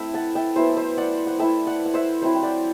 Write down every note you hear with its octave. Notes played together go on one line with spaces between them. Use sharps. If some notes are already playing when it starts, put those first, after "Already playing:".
Already playing: A3 C4 E4 E5
F#5 A5
E5 G5
F#3 B3 E4 C5 E5
C5 E5
D5 F#5
F#5
A3 E4 E5 G5
D5 F#5
F#5
C5 E5
F#3 C4 E4 C5 E5
G5
D5 F#5